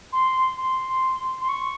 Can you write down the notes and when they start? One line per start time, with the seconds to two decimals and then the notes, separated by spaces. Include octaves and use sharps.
0.13 C6
0.58 C6
1.41 C6
1.49 C#6